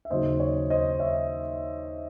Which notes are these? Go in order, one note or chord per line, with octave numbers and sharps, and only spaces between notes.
E5
D#2 C#3 F#3 C5 D#5
C#5
C5 D#5
C#5 E5